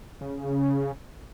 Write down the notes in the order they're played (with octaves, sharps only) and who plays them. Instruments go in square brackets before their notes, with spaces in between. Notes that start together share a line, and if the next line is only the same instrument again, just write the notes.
[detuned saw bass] C#3